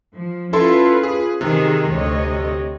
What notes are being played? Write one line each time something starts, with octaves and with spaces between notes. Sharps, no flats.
F3
C#4 E4 F4 A4 B4 C6
G#4
C3 D#3 G#4
D2 C#5 D#5